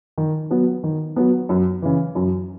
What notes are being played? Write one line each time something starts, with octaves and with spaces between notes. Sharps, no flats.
D#3
F#3 B3
D#3
F#3 B3
F#2
C#3 E3
F#2